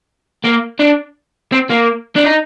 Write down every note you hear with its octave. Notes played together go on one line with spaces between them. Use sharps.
A#3
D4
C4
A#3
D4
D#4